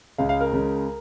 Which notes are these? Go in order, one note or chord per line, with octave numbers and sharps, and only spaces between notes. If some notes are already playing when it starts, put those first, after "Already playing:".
C#2 C#3 G#3 F5
F5
A#4
C#2 C#3 G#3